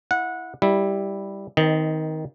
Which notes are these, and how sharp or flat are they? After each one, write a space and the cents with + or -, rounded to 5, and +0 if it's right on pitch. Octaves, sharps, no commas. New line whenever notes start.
E4 +0 F#5 -20
G3 +0 E4 -10
D#3 +15 C4 -25 D#5 +0